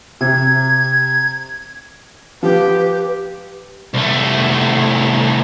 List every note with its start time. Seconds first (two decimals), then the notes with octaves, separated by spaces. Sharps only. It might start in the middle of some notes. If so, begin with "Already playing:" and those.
0.21 C3 G#6
2.43 F3 G4 B4
3.94 C2 A3